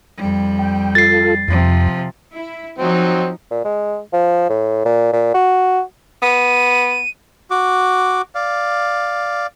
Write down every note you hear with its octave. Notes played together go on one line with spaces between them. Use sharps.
F2 G3
G5
F4 A4 A6 C7
F2 C3 F3
E4
F3 F#3 C4 D#4
A#2
G#3
F3
A2
A#2
A#2
F#4
B3 D#7
F#4 D6
D5 F5